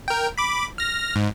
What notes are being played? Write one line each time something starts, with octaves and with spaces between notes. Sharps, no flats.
A#4 G5
B5 D6
F6 A#6
G#2